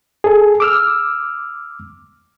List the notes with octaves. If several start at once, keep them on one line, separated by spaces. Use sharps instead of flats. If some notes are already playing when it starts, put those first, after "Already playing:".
G#4 A4
D6 E6 F6